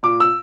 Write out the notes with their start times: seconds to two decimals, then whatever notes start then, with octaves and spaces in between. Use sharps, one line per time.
0.03 A#2 D6
0.20 E6